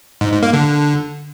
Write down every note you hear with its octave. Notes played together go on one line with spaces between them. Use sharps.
G#2
G#2
A#3
D3